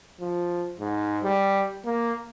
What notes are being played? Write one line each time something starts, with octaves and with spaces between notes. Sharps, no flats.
F3
G#2
G3
A#3